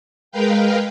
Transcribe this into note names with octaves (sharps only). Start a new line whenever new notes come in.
G#3 A#4 B4 F5 G5